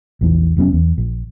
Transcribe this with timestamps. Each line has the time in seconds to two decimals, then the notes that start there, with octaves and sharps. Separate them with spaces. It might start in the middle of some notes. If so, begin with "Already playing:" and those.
0.21 A#1 E2 E3
0.56 F1 F#3 B3 C#4
0.73 E2
0.98 A#1